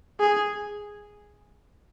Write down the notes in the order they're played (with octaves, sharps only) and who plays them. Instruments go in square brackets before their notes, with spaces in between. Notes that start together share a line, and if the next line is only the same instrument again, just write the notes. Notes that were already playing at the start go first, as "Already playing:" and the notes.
[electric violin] G#4